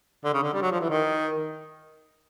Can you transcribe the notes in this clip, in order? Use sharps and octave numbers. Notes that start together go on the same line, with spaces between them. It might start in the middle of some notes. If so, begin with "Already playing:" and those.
D3
C#3
D3
G3
F#3
F3
E3
D#3